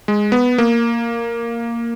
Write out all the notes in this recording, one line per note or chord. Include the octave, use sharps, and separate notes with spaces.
G#3
B3
A#3